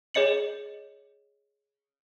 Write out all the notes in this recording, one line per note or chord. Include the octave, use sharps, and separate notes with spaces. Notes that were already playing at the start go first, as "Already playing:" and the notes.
G#4 C#5 D#5 C#7 F#7